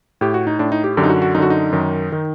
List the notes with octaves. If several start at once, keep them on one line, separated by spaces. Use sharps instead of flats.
A2 G4
F#4
D#4
A2 D4
D#4
G4
F#2 D3 G4
D#4
F#4
F#4
F#2 D3 D#4 F#4
D#4
F#2 D#3
D#3